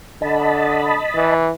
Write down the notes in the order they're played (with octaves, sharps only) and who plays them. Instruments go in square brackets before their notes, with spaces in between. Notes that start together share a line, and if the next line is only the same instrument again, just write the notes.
[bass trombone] D3 [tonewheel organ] D#5 A5 B5
[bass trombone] E3